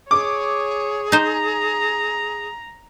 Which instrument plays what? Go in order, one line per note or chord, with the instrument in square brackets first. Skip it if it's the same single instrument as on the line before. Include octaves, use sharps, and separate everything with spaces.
[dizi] G#4 [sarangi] C#5 [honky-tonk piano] D6
[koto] D#4 C5 [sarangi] A#5